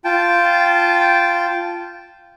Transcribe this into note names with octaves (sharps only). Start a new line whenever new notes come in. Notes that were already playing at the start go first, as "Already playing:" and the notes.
F4 G5 A5